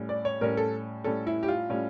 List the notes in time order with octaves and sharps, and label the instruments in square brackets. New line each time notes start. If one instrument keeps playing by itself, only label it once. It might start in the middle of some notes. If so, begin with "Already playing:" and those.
Already playing: [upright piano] A2 G3 C#4
D5
C#5
A2 G3 C#4 A#4
A4
A2 G3 C#4 A4
E4
G4
F4
A2 G3 C#4